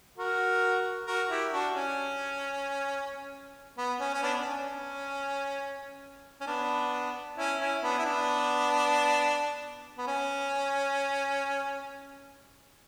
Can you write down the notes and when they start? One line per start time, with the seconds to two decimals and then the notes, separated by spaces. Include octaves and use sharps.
0.17 F#4 A#4
1.07 F#4 A#4
1.30 E4 G4
1.52 D4 F#4
1.75 C#4
3.78 B3
4.00 C#4
4.14 C#4
4.22 B3 D4
4.37 D4
4.45 C#4
6.41 C#4
6.47 B3 D4
7.37 C#4 E4
7.60 C#4 E4
7.83 B3 D4
7.99 E4
8.05 B3 D4
9.98 B3
10.07 C#4